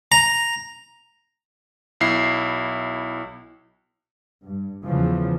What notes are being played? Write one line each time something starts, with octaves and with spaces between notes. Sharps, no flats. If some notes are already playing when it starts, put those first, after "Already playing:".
A#5
B1 E4 C7
G2
E2 C#3 E3 F3